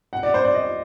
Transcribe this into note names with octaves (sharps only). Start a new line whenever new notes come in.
F#5
D5
C5
D5
D#5